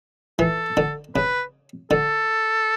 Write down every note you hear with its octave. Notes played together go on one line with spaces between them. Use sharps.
E3 A4
D3
C#3 B4
D3 A4